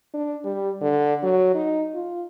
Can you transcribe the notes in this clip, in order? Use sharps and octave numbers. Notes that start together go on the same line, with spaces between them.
D4
G3
D3
F#3
D#4
F4